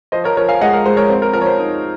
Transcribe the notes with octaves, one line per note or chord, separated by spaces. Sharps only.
F3 C5 D#5
A#4 C#5
F3 A#4 C#5
F5 G#5
G#3 D#5 F#5
A#4
G#3 C5
A#4 C#5
C4
A#4
F3 A#4
C#5
C5
D#4